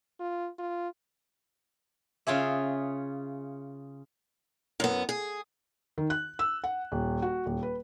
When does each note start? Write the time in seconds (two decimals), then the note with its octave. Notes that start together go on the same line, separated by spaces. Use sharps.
0.20 F4
0.59 F4
2.27 C#3 F4 G#4 E5
4.80 F#2 B3
5.09 G#4
5.98 D#3
6.10 F#6
6.39 E6
6.64 F#5
6.92 D#1
7.22 F#4
7.46 D#1
7.63 B4